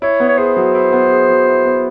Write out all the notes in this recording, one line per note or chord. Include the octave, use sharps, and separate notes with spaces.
E4 C#5
B3
C#5
G#4 C5
F#3
E4
B3
G#4
F#3
E4
B3